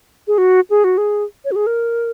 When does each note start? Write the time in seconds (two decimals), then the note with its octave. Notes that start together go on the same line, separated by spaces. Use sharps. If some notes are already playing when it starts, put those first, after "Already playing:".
0.27 G#4
0.38 F#4
0.70 G#4
0.84 F#4
0.98 G#4
1.45 C#5
1.52 F#4
1.56 G#4
1.67 A#4